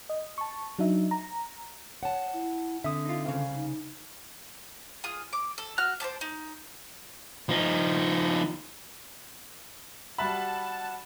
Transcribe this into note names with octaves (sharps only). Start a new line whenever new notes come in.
D#5
A5 C#6
F#3 D4 D#4 E5
A#5
C#5 F#5 A5
E4
D3 C4 E5 D#6
D#4 F4
C2 C#3 F5
D#4
F4 G#4 D#6
D6
A4
F#4 F6 F#6
C5 E5 A5 D6
D#4
F3 D#4
G3 F#4 E5 F#5 A5 B5